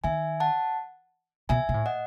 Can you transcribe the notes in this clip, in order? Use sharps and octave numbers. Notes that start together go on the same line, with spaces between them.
D#3 E5 G#5
F#5 A5
B2 E5 G#5
B2
A2
D#5 F#5